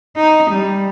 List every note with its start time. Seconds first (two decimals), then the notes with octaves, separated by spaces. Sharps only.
0.17 D#4
0.51 G3